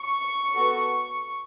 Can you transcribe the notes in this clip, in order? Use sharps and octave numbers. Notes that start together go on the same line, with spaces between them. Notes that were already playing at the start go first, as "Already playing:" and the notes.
Already playing: C#6
B3 F#4 A4